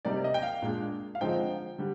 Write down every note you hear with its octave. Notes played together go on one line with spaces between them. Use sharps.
C3 G3 A#3 D#4 D5
D#5
G5
F5
A#2 G#3 D4
F5
D3 F3 G#3 C4 D#4 G5
D3 G3